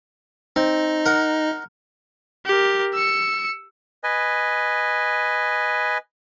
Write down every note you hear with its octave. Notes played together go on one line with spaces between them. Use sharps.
C4 D#4 D#5
A#4 F#5
G4 A#4
E6 C#7
B4 D#5 G#5